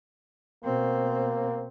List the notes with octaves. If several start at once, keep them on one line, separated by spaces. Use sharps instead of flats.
B2 A#3 C4